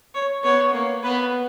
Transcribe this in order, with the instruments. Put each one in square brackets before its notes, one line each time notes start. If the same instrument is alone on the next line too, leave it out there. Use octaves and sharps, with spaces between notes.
[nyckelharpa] C#5
[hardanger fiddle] B3 [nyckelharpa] C#5
[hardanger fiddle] A#3
[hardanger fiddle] B3 [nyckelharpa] B4